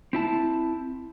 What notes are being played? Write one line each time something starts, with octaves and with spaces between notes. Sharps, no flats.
C4 E4 A5